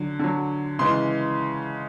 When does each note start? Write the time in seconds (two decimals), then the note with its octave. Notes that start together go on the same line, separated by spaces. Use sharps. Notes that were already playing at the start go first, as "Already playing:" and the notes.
Already playing: D3 F#3
0.19 D3 F#3
0.79 C#3 E3 G#3 C6